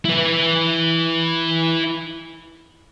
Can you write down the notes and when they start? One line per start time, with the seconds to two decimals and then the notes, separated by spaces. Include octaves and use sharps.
0.05 E4 B4